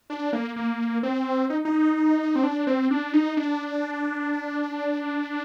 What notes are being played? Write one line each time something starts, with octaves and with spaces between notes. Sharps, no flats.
D4
A#3
A#3
C4
D#4
D#4
C4
D4
C4
D4
D#4
D4